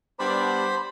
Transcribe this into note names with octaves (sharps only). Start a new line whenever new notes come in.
G3 B3 D4 C5 B5